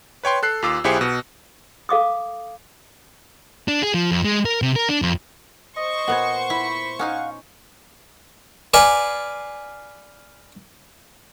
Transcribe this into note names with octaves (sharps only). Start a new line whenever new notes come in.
B4 C#5 G5 C6
A4 F#6 C7
D#2 F4 D6 E6
B1 E4 G4 G#4 C5 C#7
B2
A4 F5 D6 D#6
D4
G#4
F3
F2
G#3
A#4
C3
A#4
D4
F2
C5 D#5 C#6
A#2 B3 F#5 G#5
E4 B5
C#4 D#4 F5 F#5 G#5
B4 D5 F5 G#5